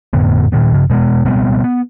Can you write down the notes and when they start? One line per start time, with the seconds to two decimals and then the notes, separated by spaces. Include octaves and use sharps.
0.13 F2 A2 D3 B3
0.52 A#2 D#3 B3
0.73 G2 C#3
0.90 B2 G#3 A3 B3
1.25 B2 G3 B3 C4
1.64 B3